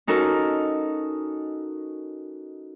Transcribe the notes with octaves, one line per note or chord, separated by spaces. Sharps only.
C#4 D#4 F#4 A4 A#4